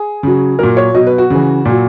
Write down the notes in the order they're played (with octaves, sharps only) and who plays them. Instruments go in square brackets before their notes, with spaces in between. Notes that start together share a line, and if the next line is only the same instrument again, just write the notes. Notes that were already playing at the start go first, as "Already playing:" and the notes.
Already playing: [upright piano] G#4
C#3 F#3
A#2 F#3 A#4
C#5
B2 F#3 D#5
B4
F#4
C#3 E3
A#2 F#3